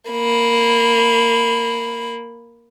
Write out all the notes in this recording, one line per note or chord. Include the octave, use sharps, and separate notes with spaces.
A#3 B5